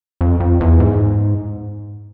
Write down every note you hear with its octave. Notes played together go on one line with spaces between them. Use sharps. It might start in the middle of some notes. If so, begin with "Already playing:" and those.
F2
F2
E2
G#2